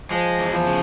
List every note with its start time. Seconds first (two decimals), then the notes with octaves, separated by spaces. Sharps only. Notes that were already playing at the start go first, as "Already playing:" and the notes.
0.10 F3 G#3
0.39 E2
0.51 F3
0.66 C#3